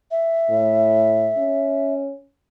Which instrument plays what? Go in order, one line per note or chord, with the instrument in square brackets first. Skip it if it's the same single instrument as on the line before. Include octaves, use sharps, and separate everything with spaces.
[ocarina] E5
[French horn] A2
C#4